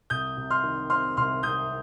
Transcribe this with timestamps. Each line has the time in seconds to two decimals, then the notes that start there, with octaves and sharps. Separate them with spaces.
0.10 C2 D#6 G6
0.37 C3
0.50 C6 F6
0.64 D#3
0.90 C4 C6 F6
1.17 C2 C6 F6
1.43 C3 D#6 G6